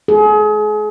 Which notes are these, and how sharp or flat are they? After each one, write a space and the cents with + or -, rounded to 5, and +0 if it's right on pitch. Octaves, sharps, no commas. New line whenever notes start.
G#4 +35